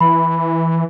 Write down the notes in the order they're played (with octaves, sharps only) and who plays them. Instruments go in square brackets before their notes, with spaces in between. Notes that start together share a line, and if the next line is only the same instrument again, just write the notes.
[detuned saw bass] E3 [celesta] B5